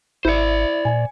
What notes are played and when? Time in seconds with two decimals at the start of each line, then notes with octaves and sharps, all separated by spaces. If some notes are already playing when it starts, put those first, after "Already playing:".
0.25 G#1 E4 C5 D5 C#7
0.85 A#2 G#5